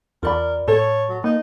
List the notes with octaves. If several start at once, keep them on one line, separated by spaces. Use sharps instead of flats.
E2 F4 A#4 D5 B5
A2 A4 C#5
F#3
A#3 D#4